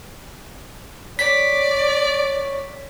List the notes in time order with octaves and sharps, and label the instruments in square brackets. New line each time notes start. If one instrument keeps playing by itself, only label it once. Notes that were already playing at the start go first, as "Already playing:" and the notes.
[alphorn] C#5 [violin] D5 [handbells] B6